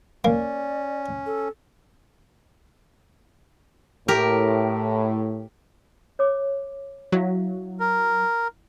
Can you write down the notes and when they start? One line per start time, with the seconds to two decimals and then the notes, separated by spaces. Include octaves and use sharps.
0.25 A#3 C#4 D5
1.26 A4
4.08 A2 G4 A#4
6.19 C#5 D6
7.12 F#3 E4 E5 F5
7.80 A#4